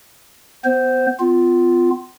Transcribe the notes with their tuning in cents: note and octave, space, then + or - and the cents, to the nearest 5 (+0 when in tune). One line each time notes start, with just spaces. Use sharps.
B3 +20 C5 -5
B3 +40 F4 +0